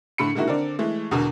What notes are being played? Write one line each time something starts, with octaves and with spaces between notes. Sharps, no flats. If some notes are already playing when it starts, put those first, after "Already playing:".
A2 D3 B5 C#7
D3 D#3 G#3 A#3 E4 F#4
D3 C4 A#4 D5
E3 G#3 A3
E2 B2 D3 A#4